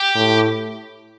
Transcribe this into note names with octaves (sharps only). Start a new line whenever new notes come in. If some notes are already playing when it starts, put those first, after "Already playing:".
Already playing: G4
A2